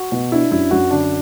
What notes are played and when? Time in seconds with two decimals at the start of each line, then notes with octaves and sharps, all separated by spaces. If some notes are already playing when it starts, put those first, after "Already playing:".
Already playing: F#4
0.12 B2
0.32 D4 E4
0.51 F#2 E4
0.71 F#2 F#4
0.91 D3 D4